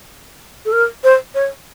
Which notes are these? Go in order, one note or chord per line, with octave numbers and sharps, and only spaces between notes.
A4
A#4
C5
C#5